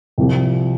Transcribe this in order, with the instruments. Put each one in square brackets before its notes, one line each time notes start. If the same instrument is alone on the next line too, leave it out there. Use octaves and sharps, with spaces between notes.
[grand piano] C2 C3 F3 C4 G4